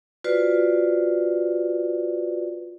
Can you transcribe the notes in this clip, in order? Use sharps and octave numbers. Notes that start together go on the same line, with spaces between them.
F4 F#4 B4 C5 D5